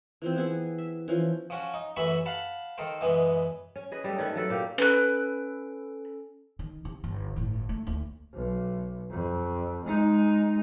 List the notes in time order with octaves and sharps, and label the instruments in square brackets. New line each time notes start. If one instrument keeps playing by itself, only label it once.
[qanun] E3 F3 C4
B3 E4 G#4
E5
E3 F3 C#4
[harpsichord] F3 C#4 F#4
D#4
A1 F#2 E3 E5 B5 C#6
F5 F#5 A5 B5
D#3 A4 A#4 C5
F#2 B2 E3 G#3 B3
[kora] C#4
G#4 B4 D#5
G3 A3
D#3 A3 C#4 B4
F#3 A3 A4 B4
A#2 A#3 G4
[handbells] C#4 A4 D7 [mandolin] B4 F#6
[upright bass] D#3
C3
G1
G1 A2
A3
D2 A3
[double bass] B1
F2
G#3 D#4